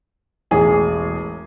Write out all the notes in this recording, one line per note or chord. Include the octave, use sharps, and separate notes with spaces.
E1 A1 G#4